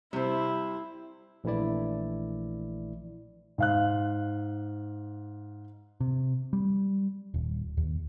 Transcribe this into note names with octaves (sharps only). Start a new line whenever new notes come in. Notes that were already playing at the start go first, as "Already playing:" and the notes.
C3 G3 E4 C5
A#1 E3 A3 E4 D5
G#2 F5 F#6
C3
G3
D#1
D#2